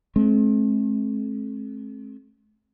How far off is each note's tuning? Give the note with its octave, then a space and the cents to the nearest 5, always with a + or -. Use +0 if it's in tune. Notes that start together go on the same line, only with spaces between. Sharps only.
A3 -45 C4 +35